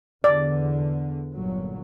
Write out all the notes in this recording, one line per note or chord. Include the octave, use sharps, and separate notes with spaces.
E2 D3 D5
G1 A#2 F#3